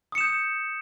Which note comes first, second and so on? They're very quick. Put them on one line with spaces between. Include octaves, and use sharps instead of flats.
D#6 C#7 E7 G6